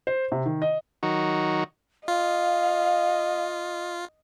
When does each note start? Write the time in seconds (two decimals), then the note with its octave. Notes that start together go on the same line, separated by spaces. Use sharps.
0.07 C5
0.32 C3
0.46 D#3
0.62 D#5
1.03 D#3 F#3 D#4 F#4
2.08 F4 D#5 F5